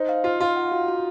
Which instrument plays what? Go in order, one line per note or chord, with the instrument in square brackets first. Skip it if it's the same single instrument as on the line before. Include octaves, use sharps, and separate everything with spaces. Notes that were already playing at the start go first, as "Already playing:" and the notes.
Already playing: [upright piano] D#4 [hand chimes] C5
[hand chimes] F5
[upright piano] F4 [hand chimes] F5
[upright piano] F4 [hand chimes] F5
[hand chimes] F#5
F#4
F#4